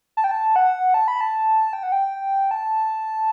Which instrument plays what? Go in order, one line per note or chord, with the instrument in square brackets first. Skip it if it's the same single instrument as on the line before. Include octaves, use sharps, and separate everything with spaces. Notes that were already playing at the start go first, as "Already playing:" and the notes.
[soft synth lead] A5
G5
A5
F#5
A5
B5
A5
G5
F#5
G5
A5